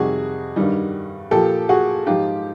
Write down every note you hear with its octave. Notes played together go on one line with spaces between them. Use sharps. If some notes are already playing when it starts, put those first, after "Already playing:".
Already playing: F2 C3 D#3 G3 F#4 G#4
G2 D#3 G3
A#2 F3 G4 A4
F#4 G#4
G#2 F3 F4 G4